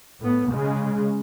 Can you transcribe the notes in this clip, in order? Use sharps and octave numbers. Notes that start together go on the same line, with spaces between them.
A2 B3
C#3 G#3